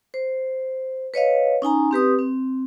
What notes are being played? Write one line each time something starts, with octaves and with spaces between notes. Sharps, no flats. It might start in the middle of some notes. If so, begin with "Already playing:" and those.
C5
B4 C#5 D#5 F5
C#4 D#4 G#5 A#5
C4 G4 B4 D#6
C4